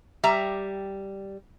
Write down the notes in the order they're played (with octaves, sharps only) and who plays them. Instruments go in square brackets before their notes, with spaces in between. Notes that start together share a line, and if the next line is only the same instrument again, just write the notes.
[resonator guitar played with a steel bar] G3 E5 A#5